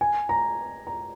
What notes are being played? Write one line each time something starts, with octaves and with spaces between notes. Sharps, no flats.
G#5
A#5
A#5